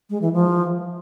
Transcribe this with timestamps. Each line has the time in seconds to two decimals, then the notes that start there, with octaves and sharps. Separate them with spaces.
0.10 G#3
0.22 E3
0.33 F3